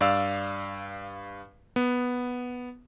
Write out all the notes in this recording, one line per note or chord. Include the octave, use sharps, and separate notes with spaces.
G2 D5 F5 E6
B3